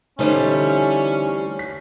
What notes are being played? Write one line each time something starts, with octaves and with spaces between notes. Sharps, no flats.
D3 E3 G3 A3 C#4 D#4 C5
B6